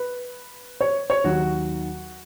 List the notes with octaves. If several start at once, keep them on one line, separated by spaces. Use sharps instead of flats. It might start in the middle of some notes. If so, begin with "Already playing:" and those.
Already playing: B4
C#5
C#5
D#2 D#3 F#3 F#4